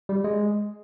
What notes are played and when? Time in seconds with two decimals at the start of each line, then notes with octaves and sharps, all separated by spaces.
0.09 G3
0.24 G#3